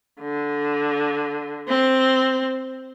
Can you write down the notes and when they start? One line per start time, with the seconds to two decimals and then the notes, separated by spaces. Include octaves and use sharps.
0.20 D3
1.68 C4